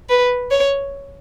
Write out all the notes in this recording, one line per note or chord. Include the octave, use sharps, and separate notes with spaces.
B4
C#5